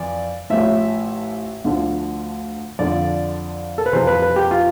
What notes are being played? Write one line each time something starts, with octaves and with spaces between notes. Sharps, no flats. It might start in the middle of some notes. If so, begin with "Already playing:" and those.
Already playing: F2 E3 D5
A1 A2 F3 E5
D2 D3 F3
F2 D3 F3 D5
A4
B4
F2 C3 E3 C5
B4
B4
G4
F4